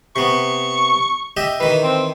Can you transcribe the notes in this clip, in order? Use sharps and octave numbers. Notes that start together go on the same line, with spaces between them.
C3 B3 C#6
G4 D#5 E5
D#3 E3 B4
C4